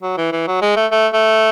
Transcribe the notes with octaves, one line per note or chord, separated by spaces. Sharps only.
F#3
E3
E3
F#3
G#3
A3
A3
A3